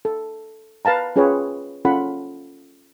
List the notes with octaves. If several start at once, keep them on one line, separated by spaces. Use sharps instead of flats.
A4
B4 F5 A5 A#5
C#4 F4 G#4 B4 C#5 G5
C#4 F4 A4 F#5 B5